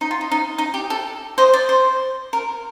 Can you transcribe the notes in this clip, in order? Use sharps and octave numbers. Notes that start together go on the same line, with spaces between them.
D#4
F4
D#4
D#4
D#4
G4
A4
C5 D#5
D5
C5
A#4